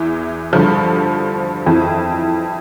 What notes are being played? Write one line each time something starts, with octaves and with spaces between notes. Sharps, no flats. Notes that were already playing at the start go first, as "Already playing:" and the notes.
Already playing: E2 E3
G2 D3 F3
F2 E3